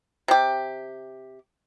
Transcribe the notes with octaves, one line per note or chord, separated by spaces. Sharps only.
C3 G4